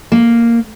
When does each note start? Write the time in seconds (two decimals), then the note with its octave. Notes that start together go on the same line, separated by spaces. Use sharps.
0.12 A#3